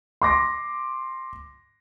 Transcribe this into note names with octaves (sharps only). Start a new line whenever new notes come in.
C6 D6 A#6